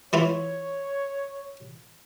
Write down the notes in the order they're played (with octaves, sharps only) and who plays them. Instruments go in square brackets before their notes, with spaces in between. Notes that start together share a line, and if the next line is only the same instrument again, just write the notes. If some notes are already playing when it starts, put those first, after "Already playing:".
[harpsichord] E3 E4 F4 [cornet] C#5